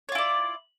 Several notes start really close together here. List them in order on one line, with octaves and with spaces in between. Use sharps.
C#5 F4 E4 D5